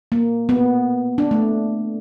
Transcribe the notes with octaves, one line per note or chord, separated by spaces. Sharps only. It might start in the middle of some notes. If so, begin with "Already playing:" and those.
A#3
B3
D4
A3